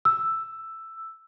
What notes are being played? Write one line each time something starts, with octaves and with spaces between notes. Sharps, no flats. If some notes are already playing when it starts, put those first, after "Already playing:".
E6